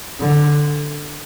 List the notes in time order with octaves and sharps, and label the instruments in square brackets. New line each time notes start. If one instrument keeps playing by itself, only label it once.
[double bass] D3